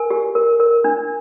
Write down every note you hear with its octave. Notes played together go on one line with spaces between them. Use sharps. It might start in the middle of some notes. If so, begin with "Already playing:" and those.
Already playing: A#4 G#5
G4
A#4
A#4
D4